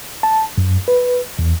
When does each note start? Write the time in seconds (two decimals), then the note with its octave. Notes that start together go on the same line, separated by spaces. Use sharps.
0.23 A5
0.58 F#2
0.88 B4
1.39 E2